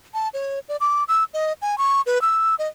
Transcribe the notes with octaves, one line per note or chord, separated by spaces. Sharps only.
A5
C#5
D5
D6
E6
D#5
G#5
C#6
B4
E6
D#5